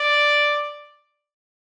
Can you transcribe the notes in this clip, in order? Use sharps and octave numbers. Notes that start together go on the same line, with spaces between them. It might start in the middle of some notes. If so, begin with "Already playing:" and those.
Already playing: D5